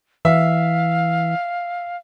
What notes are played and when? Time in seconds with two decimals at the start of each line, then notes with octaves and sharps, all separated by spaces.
0.25 E3 E5 F5